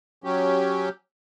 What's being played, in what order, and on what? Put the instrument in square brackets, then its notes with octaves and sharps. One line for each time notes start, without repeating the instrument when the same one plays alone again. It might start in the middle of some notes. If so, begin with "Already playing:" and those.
[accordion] F#3 C#4 G4